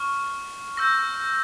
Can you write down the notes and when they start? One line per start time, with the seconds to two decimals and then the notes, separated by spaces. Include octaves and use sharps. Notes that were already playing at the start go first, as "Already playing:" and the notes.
Already playing: C#6 F6
0.77 C#6 E6 G6 A#6